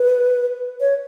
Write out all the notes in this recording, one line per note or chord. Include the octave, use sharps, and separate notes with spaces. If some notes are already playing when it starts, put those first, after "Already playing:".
Already playing: B4
C#5